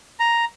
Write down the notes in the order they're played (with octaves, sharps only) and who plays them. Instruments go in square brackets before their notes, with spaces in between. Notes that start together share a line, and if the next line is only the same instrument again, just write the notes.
[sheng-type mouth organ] A#5